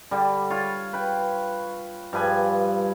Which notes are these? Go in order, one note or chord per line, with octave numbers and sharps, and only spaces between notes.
D3 G3
F4 C#5
B4 G5
G2 F3 B4 G#5